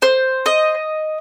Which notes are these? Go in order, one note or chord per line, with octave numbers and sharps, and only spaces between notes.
C5
D#5